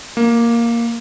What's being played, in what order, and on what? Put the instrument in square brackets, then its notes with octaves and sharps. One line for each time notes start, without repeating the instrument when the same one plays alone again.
[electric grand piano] A#3